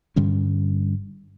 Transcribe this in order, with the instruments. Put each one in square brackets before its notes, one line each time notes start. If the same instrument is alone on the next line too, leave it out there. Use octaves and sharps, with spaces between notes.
[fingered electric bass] G2 D3 G3 C#4